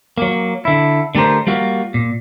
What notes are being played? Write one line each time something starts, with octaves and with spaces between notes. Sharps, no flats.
F#3 A#3
D3 E4
D3 A3 G4 A#4 C5
G3 A#3 F4 F#4
A#2